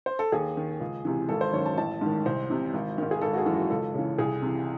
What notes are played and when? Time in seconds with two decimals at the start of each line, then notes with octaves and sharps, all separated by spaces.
0.06 C5
0.19 A4
0.32 D#2 G#4
0.57 D#3
0.80 C#2
1.05 C3 E3
1.29 G#1 A4
1.41 C5
1.53 F#2 D#3 C#5
1.66 A5
1.78 A1 A5
2.01 G#2 D#3
2.26 C2 C5
2.50 C3 E3
2.74 G#1
2.98 G#2 D#3
3.11 G#4
3.21 G#1 A4
3.33 F#4
3.38 G#4
3.46 F#2 E3
3.54 F#4
3.70 C#2 A4
3.94 C#3 E3
4.18 C2 G#4
4.42 C3 E3